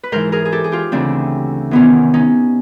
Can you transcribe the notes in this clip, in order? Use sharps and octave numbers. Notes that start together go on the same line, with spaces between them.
B4
G#2 E3 A#4 C5
G#4 A#4
G#4
G4 A4
G#4
F4 G4
D2 C#3 E3 C4 D4
E2 C3 D#3 B3 C#4
C#4 D#4